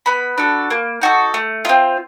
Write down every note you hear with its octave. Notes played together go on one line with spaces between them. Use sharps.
B3 B5
D4 F#4 A4
A#3
D#4 F#4 A4
A3
C4 F4